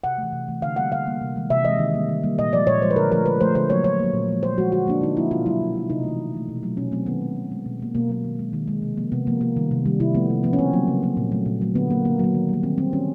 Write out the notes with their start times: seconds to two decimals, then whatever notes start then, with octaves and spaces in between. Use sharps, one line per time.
0.04 C3 F#5
0.18 E3 A3
0.32 C3
0.48 E3 A3
0.62 D3 F5
0.76 G3 A#3 F#5
0.92 D3 F5
1.07 G3 A#3
1.21 C3
1.36 E3 G#3
1.50 C3 E5
1.65 E3 G#3 D#5
1.79 D#3
1.94 G3 A#3
2.09 D#3
2.23 G3 A#3
2.39 A#2 D#5
2.52 F3 G#3 D5
2.67 A#2 C#5
2.82 F3 G#3 C5
2.90 B4
2.96 D3 A#4
3.12 F3 A3 A#4
3.26 D3 B4
3.40 F3 A3 C5
3.55 D3 C5
3.69 F#3 A#3 C#5
3.84 D3 C#5
3.99 F#3 A#3
4.14 A#2
4.29 F3 G#3
4.43 A#2 C5
4.58 F3 G#3 F#4
4.72 D3 F#4
4.87 F3 A#3 D4
5.01 D3 D#4
5.17 F3 A#3 E4
5.31 B2 F4
5.46 F#3 A#3 E4
5.61 B2
5.74 F#3 A#3
5.90 C3 D#4
6.04 E3 A3
6.19 C3
6.34 E3 A3
6.48 B2
6.63 F#3 A3
6.77 B2 C#4
6.92 F#3 A3 C4
7.06 D#3 B3
7.21 G#3
7.37 D#3
7.51 G#3
7.66 B2
7.80 F#3 A#3
7.95 B2 A#3
8.09 F#3 A#3
8.24 D#3
8.39 G#3
8.53 D#3
8.68 G#3
8.82 C3
8.97 F3 A#3
9.12 C3 B3
9.27 F3 A#3
9.41 C3 A#3
9.57 D#3 G3
9.71 C3
9.86 D#3 G3
10.00 C3 E4
10.15 F3 A3 B3
10.30 C3
10.43 F3 A3 B3
10.53 C#4
10.59 C#3 C4
10.73 F#3 A#3
10.88 C#3
11.03 F#3 A#3
11.17 A#2
11.32 F#3 A3
11.46 A#2
11.61 F#3 A3
11.75 D3 B3
11.90 F#3 A#3
12.05 D3 A#3
12.19 F#3 A#3
12.34 D#3
12.49 G3 A#3
12.63 D#3 C4
12.78 G3 A#3 C4
12.93 D#3 C#4